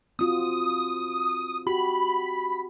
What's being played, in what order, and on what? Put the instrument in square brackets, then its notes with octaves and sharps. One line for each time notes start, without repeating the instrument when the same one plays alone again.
[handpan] C4 F4 F#4 [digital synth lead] D#6
[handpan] F#4 G4 [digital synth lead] B5